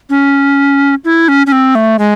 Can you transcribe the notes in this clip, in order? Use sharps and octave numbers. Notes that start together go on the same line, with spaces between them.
C#4
E4
C#4
C#4
C4
A3
G#3